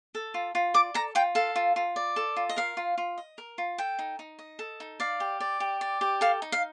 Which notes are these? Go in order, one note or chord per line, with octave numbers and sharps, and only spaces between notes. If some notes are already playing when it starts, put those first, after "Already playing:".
A4
F4
F4
D5 D6
A4 A#5
F4 G5
A4 F5
F4
F4
D5
A4
F4
D#5
A#4 F5
F4
F4
D#5
A#4
F4
A4 G5
D#4
D#4
D#5
A4
D#4
D5 F5
G4
D5
G4
D5
G4
A4 F5
D#4
F5